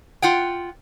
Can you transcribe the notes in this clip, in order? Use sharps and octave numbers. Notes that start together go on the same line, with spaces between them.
F4 F#5 G5